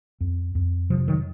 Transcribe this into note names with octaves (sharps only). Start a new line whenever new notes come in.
F2
F2
C3 F3
D#3 F#3